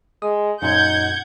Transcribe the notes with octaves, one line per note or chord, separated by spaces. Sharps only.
G#3 D#6
F#2 A#2 D#4 F#5 G6 G#6